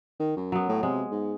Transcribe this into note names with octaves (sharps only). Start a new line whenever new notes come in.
D#3
F#2
F#3 B3
A2
C3 G#3
G#2